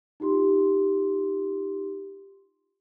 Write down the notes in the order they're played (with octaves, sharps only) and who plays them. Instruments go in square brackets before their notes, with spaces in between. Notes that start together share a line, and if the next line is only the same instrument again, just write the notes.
[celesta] D#4 F4 G4 C6